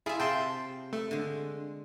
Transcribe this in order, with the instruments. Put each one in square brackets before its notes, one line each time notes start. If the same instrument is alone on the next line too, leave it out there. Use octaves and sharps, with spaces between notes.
[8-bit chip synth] E4 G#4 [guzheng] F4 E5
[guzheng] C3 [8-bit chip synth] G5 A5 C6
[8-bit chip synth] A3
[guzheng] D3 G#3